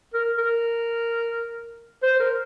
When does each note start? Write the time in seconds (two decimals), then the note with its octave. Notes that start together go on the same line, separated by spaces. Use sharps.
0.14 A#4
0.38 A#4
2.03 C5
2.20 A#4